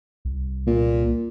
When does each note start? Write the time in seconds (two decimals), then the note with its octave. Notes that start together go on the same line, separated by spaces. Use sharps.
0.25 C2
0.67 A#2